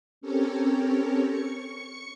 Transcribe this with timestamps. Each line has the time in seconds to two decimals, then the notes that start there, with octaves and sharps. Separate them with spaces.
0.21 C4 C#4 G4 A4 A#4 C#5
1.26 C#6 C#7